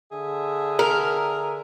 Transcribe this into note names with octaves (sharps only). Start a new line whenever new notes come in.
D3 G#4 E5
A#4